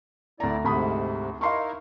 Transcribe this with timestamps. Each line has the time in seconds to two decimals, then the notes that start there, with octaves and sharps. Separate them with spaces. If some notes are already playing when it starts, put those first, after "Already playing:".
0.40 D2 E4 D5 A#5
0.64 D2 G#2 C3 B5 D#6
1.41 D#4 E4 A#4 F5 C6 C#6